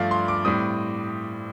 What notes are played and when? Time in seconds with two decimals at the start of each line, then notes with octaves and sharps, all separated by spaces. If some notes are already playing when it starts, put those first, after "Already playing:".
Already playing: G2 F3 A3 D5 F5
0.11 C6
0.28 D6
0.45 A2 G3 C4 D#6